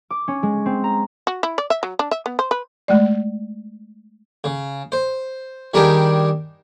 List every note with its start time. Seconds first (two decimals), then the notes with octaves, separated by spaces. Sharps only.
0.10 D6
0.28 C#4
0.43 G#3
0.66 C4
0.84 A#5
1.27 F#4
1.43 E4
1.58 D5
1.70 E5
1.83 F#3
1.99 D4
2.11 E5
2.26 B3
2.39 C5
2.51 B4
2.88 G#3 A3 D5
4.44 C#3
4.92 C5
5.74 D#3 G3 D4 G4 G#4 A#4